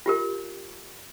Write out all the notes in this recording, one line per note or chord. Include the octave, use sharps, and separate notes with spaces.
F4 G4 A#4